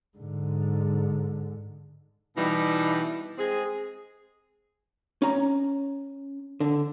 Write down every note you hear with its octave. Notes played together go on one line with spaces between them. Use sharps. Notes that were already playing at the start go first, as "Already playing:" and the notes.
G#2 D3
B2 E3 G3 D#4
G#3 C4 G#4
C#4 A#5
D3